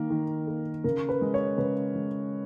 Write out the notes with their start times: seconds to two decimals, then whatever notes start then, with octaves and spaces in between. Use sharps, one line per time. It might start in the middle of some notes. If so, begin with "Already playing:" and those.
Already playing: D#3 A#3 A#4
0.10 D#3
0.47 A#3
0.84 C#3 A#4
1.09 B4
1.21 G#3
1.34 C#5
1.58 C#3 B4
1.95 G#3